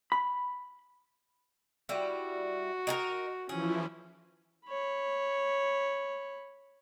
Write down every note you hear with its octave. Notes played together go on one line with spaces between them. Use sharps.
B5
G3 E4 F#4
D#4 G#4 A#4
E3 F3 C#4 E4 G#4
C#5 B5